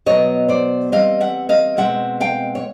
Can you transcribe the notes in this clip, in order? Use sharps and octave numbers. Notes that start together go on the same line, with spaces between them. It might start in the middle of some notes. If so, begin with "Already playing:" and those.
B2 F#3 B3 C#5 D#5
C5 D5
E3 G3 C4 D#5 F5
E5 F#5
D#5 F5
B2 G#3 C4 E5 F#5
F5 G5
C#5